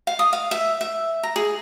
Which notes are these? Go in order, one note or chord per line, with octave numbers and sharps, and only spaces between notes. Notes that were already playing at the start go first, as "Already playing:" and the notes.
F5
D#6
F5
E5
E5
A#5
G#4